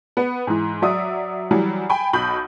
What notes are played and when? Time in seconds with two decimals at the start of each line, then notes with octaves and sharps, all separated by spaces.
0.17 B3
0.47 G#2 E3
0.82 F#3 D5 E5 D#6
1.51 E3 F#3 G3
1.90 G5 G#5 B5
2.13 B1 B2 B5 G6 F#7